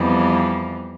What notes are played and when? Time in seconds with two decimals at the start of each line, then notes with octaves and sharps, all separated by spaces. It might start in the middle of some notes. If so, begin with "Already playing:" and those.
Already playing: F2 E3 G3 B3